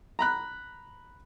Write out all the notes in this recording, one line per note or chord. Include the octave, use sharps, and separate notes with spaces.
A#5 B5 F#6